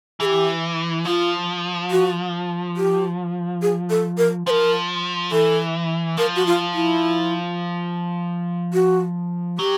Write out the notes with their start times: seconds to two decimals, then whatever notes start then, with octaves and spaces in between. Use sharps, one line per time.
0.20 E3 G#4
0.25 G4
1.05 F3 F4
1.91 F#4
2.77 G4
3.62 G#4
3.90 A4
4.18 A#4
4.47 F3 C5
4.50 A#4
5.32 E3 A4
6.17 F3 A#4
6.36 F#4
6.46 F4
6.74 E4
8.74 F#4
9.58 F#3 G4